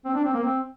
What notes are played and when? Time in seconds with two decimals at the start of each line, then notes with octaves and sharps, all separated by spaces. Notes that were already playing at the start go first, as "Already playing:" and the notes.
0.05 C4
0.15 D4
0.24 C4
0.34 A#3
0.44 C4